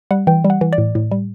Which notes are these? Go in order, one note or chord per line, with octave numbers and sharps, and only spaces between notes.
G3 F#5
E3 G5
G3
F#5
E3
D5
A2
A2
G3